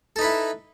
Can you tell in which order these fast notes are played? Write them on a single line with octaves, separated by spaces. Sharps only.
A4 D#4 B4 E4